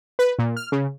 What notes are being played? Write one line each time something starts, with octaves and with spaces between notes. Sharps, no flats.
B4
A#2
F6
C#3